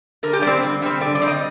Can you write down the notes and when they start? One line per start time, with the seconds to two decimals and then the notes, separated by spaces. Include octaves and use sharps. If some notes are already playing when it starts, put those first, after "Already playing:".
0.23 D3 A#4
0.33 G4
0.42 G3 C4 D5
0.62 D3
0.82 G3 C4
1.01 D3 D5
1.15 D5
1.22 G3 C4
1.27 D#5